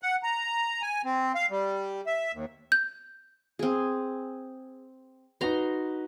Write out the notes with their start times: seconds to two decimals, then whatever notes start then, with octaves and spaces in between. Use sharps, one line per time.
0.03 F#5
0.23 A#5
0.82 G#5
1.04 C4
1.35 F5
1.50 G3
2.07 E5
2.33 D#2
2.72 G6
3.59 C4 G#4
5.41 D#4 F#4 B4 A#5 C6